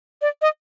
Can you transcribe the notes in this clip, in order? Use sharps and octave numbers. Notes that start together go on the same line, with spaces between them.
D5
D#5